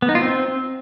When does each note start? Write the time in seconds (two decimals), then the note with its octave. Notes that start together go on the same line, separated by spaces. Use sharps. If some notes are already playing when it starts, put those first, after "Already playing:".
0.02 B3
0.09 D#4
0.15 F4
0.21 C4